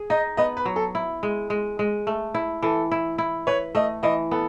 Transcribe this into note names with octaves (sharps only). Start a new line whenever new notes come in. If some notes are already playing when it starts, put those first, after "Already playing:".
Already playing: G#4
D#4 D#5
B3 D#5
B4
F#3
A4
E4
G#3
G#3
G#3
A3
E4
E3 A4
E4
E4
B4 C#5
A3 D#5
E3 D#5
B3 A4